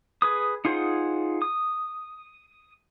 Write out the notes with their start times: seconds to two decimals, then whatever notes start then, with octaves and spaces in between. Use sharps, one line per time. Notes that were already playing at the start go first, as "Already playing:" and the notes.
0.22 G#4 B4 D#6
0.65 D#4 F4 G#4 C5 F#5
1.42 D#6